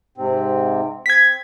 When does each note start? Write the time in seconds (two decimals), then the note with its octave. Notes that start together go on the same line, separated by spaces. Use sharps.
0.18 G#2 C3 C4
1.06 C4 G#6 B6